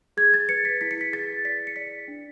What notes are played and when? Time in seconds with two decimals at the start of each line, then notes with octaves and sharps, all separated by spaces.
0.17 G#4 G#6
0.34 A6
0.49 B4 C#7
0.65 B6
0.81 E4 B6
0.91 C#7
1.01 B6
1.13 G#4 A6
1.45 D5 B6
1.67 C#7
1.76 D5 B6
2.08 D4